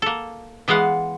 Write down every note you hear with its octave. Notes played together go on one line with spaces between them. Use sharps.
A#3 A4
E3 G#3 B3 F5 F#5